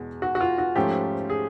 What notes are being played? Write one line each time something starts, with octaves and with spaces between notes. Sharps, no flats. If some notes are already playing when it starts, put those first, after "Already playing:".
Already playing: E2 B2 G#3
F#4
F#4
F4
F#4
G#2 F3 A3 C#4 G4
G#4